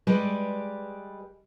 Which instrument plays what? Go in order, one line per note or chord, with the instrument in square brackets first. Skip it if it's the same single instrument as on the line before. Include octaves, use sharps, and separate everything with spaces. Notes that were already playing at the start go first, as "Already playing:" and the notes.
[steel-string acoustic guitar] G3 G#3 B4 D5